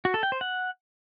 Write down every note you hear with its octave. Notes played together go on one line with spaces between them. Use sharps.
F#4
A4
G5
C5
F#5